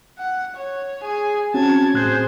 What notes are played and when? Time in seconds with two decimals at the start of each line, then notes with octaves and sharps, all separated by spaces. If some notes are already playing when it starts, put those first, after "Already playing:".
0.19 F#5
0.57 C#5
1.02 G#4 G#5
1.54 C4 C#4 F#4 A5 G#6
1.94 A2 G#4 C5 F#6 G#6